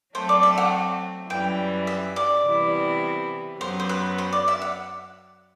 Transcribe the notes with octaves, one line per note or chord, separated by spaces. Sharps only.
F#3 A3 C4 C5
D5
E5
F#5
F#2 E3 G3 G5
E5
D5
C3 E3 G3 B3 E4
F#2 F#3 B3 C5
C5
B4
C5
D5
E5
F#5